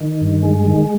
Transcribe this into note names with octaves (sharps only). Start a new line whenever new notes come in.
D#3
G2
G#3
D#3